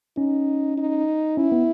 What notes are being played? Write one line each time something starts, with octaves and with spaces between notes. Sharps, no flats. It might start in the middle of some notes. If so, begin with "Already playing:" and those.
C#4 D#4
D#4
C#4 E4
B3